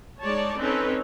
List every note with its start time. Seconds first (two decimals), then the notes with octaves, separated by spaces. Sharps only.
0.22 G#3 D#4 C#5 D5 A5
0.58 C4 C#4 D#4 A4 B4 C#5